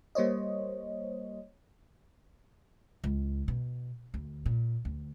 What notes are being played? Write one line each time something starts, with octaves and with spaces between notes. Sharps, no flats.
G3 A#3 C5 C#5 D#5
C#2
B2
D2
A#2
D2